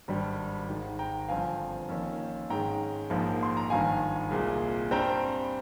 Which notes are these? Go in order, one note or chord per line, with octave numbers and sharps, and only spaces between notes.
G#1 G2 G3
G#1 G#2 D#3
G5 A#5
G1 G2 F3 C4 F5 G#5
F2 D#3 A#3 C#4
G#2 D#3 G#3 C#4 G5 A#5
A#1 G#2 F3 A#3
C6
A#5
G#1 G2 D#3 F5 G#5
C2 A#2 G#3
G2 G3 C4 G5 A#5